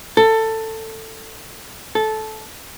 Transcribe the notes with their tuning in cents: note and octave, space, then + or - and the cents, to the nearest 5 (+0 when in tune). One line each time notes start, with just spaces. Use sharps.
A4 +15
A4 -15